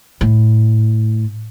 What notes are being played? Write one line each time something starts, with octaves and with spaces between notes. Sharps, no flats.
A2